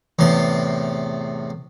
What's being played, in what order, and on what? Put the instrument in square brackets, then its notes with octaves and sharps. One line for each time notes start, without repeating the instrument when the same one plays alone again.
[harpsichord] E2 A2 C3 C6